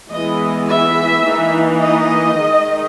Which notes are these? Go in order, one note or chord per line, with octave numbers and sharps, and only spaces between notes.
E3 G#3 B3 E4 D#5
E5
E3 A#3 D#4
D#5
D#3 G#3 D#4